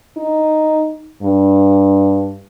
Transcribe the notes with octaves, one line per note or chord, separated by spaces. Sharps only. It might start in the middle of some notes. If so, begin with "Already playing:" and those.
D#4
G2